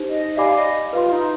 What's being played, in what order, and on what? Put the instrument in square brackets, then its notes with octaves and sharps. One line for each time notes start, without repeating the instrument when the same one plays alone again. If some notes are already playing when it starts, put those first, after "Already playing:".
Already playing: [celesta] D#4 G4 C5
[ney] D#5
[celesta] G4 D5 G#5 B5 D6 [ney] F5
[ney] D#5
[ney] F4 [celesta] B4 F5 C6
[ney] D#4